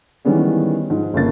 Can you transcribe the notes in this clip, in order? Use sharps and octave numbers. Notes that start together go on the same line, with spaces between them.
D#3 E3 G3 G#3 B3 C#4
G#2 F3
G1 C#3 A#3 A6